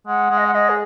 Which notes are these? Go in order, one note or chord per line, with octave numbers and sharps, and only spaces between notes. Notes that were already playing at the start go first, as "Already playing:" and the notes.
G#3 F#5
G#3
D#5
F#5
G#3 D#5
G#4